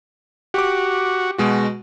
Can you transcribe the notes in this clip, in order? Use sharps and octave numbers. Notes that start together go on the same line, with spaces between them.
F#4 G4 D6
B2 G#3 F#4